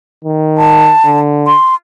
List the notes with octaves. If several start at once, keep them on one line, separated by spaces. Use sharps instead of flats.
D#3
A5
D3
C6